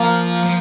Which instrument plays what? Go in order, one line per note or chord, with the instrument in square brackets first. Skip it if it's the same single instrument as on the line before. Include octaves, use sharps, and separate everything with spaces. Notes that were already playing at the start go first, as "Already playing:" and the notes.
Already playing: [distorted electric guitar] F3 [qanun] A#3
[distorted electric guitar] F3